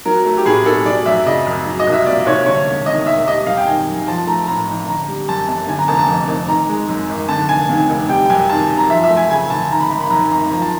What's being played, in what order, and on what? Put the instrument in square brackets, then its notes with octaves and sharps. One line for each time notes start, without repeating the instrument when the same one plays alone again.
[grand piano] F#3 A#4
A3
G4
A2 G#4
B1 A4
F#3 D5
F#2 E5
C#3 D#5
F#2
F#3
D#5
C2
E5
A#2 D5
C2 C#5
D3 C#5
E1
D#2 D#5
E1 E5
G3 D#5
F#2 F5
G5
D#3 G#5
F#2
F3 A5
A3 A#5
A2 A#5
A1
D3 A#5
G3
F#2 A5
G1 A5
D3 G#5
A#5
F1 A5
A#5
A5
F2
F1
D#3 A#5
G#3
F#2
G#1
D3 A5
F1 G#5
D#2
F1
G3 G5
G5
F#2 G#5
D#3 A5
F#2
A#5
F3 E5
E5
A3
G#5
C#3 G#5
D2 A5
D#3 A#5
B5
G#1 A#5
B5
F#2 A#5
G#1 A#5
F3 A#5
A5